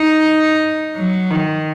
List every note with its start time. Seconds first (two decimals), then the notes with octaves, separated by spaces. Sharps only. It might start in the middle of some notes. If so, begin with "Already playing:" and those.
Already playing: D#4
0.96 F#3
1.30 D#3